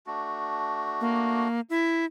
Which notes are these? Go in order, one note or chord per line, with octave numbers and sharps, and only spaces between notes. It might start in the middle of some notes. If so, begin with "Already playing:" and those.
A3 D4 F#4
A#3
E4